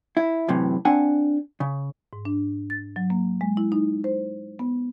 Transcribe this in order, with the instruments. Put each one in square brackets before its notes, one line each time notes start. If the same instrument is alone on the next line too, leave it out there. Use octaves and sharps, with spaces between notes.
[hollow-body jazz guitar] E4
F#2 A2 C3 E3
C4 D4 F#5 G#5
C#3
[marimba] G#2
D4
A6
F#3
A#3
G#3
E4
D#4
C5
B3